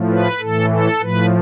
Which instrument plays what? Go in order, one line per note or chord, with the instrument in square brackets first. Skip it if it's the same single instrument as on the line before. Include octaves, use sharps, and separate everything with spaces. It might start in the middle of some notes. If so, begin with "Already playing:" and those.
Already playing: [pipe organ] A2 F3
B4
A2 E3 A4
A4
A2 F3 B4